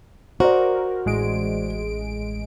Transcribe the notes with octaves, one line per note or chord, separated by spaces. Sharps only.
F#4 A#4 C5 D5
A1 G#3 D7